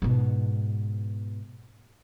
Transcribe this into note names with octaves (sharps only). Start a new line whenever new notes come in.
G#2 B2